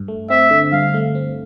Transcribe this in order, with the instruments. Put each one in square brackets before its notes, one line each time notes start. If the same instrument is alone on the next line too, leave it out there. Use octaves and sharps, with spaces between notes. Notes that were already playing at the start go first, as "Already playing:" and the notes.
Already playing: [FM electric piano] G2
A3
[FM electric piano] C4 [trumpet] E5
[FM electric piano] D3
[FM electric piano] G2 [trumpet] F5
[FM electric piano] A3
C4